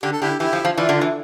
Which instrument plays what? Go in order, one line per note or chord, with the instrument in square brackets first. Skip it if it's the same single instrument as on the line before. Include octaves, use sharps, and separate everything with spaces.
[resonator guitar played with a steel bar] D3 [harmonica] G4
[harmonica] A4
[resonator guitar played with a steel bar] D3 [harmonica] E4 G4
[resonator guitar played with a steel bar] E3 [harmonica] E4 G4
[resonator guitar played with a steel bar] F3
F3
[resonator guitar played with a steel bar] E3 [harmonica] D4 F4
[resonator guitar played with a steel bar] D3
E3